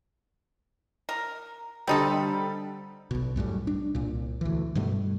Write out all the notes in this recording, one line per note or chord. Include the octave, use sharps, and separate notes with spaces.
A#4
D3 G3 C4 D#4 A4
B1 B2
C2 F#2 A2 G3
D4
C2 A#2
D2 E3
G2 B2 G3 A3